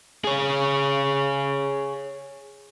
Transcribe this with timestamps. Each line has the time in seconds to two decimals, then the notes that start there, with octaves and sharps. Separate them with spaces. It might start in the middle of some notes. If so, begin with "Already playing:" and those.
0.24 G#4 C#5